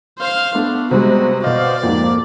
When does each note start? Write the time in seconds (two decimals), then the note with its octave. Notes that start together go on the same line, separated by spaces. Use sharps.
0.19 C5 F5
0.55 A3 B3 D4
0.91 C3 G3 G#3 F#4
1.44 B2 C5 D5 D#5 F5
1.83 F2 G#2 A#3